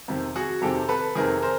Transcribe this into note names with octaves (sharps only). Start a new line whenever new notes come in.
F2 C3 D#3
F#4 G#4
F2 C3 D#3 G4 A4
A4 B4
F2 C3 D#3 G#4 A#4
A#4 C5